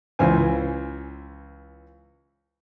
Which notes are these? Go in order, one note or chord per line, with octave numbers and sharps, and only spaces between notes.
C#2 E3 C5 G#5